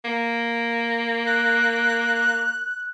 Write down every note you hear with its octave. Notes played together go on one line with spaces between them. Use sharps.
A#3
F#6